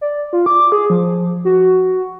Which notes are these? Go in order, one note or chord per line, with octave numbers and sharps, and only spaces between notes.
D5
F4
D6
G#4
F3
F#4